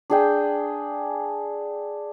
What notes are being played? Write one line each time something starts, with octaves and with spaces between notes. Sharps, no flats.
D4 G#4 G5